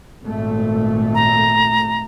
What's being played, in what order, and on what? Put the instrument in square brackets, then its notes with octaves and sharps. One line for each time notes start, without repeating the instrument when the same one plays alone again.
[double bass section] G#1 A#2 A3
[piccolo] A#5